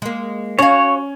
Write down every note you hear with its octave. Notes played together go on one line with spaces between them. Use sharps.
G#3 A#3
C#4 F#4 C#5 F5